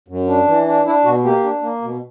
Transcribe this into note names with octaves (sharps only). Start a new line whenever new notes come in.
F#2
D4
E3
D4
D4 E4
B2 F#4
A#3 G4
D4
A#3
B2